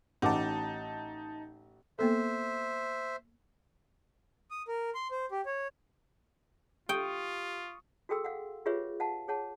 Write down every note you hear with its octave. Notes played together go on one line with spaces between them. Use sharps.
A1 D#4 F#5 A5 D6
A#3 B3 A4 C5 E5
D#6
A#4
C6
C5
G4
C#5
F4 G4 G5 C#6 D#6
F#4 G#4 A4 G5 C6 E6
F5 F#5
F4 G4 G#4 B4 C#5 E5
F5 F#5 A5
G#4 C#5 F#5 A5